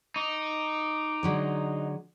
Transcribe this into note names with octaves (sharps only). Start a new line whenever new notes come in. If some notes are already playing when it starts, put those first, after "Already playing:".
D#4 D6
D3 F#3 G#3